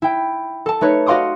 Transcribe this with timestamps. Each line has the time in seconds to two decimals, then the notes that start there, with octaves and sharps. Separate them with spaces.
0.02 E4 G5
0.66 A4 A5
0.81 A3 D#4 B4 C#5
1.06 F#4 D#5 F5 C6 D6 D#6